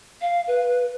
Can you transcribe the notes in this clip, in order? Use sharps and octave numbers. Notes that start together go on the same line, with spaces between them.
F5
B4